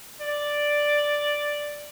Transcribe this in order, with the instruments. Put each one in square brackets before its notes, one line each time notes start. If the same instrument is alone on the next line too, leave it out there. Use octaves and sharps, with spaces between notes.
[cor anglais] D5